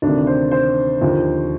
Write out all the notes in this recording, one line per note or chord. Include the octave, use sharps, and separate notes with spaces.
D2 C3 D#3 D4
C5
C5
D#2 D3 F3